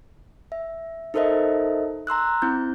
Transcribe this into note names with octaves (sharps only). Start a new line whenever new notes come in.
E5
D#4 A4 A#4 C5 D#5 E5
A#5 C6 E6 F#6
C4 E4 G6